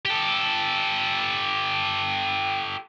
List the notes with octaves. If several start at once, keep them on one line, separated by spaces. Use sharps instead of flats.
G4 A4